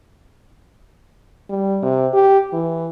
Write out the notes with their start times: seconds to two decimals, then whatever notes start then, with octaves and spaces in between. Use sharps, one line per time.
1.49 G3
1.83 C3
2.14 G4
2.53 E3